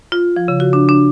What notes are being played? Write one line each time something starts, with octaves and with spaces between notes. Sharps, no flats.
F4
F3
C#3
F#4
D4
D4